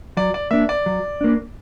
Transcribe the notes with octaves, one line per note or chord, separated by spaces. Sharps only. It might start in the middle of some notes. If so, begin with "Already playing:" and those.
F#3 D5
D5
A#3 D4 E5
D5
F#3
A#3 D4